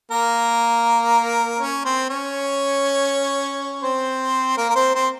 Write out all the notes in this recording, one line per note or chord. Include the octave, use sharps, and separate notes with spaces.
A#3 A#4
C#4 C#5
C4 C5
C#4 C#5
C4 C5
A#3 A#4
A#4
C4 C5
C4 C5